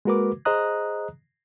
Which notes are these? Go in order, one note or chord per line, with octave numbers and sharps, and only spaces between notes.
G#3 A#3 F#4 A#4 B4 D6
G#4 C5 D#5 A#5 D#6 F#6